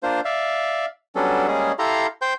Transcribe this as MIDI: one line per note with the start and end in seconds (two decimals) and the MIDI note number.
0.03 0.21 58
0.03 0.21 62
0.03 0.21 65
0.03 0.21 72
0.25 0.86 74
0.25 0.86 76
0.25 0.86 77
1.15 1.47 54
1.15 1.47 55
1.15 1.47 59
1.15 1.47 61
1.15 1.47 62
1.15 1.47 69
1.48 1.72 55
1.48 1.72 56
1.48 1.72 58
1.48 1.72 61
1.48 1.72 68
1.79 2.07 64
1.79 2.07 67
1.79 2.07 69
1.79 2.07 77
1.79 2.07 82
1.79 2.07 84
2.22 2.34 72
2.22 2.34 79
2.22 2.34 84
2.22 2.34 91